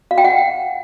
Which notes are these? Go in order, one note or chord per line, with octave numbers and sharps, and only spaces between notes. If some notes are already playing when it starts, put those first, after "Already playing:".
F5
G5
F#5